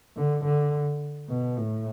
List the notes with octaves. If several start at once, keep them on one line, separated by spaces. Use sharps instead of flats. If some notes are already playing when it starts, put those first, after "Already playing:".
D3
D3
B2
A2